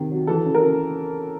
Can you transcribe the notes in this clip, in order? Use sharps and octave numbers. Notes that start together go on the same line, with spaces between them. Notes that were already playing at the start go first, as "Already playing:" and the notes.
Already playing: C3 D#3
F#3
E3 A4
C#3
A#4
C#3